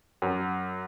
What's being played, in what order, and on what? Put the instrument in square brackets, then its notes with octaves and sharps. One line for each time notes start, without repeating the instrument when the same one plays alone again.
[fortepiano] F#2